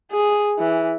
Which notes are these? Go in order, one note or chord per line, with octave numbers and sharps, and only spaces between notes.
G#4
E3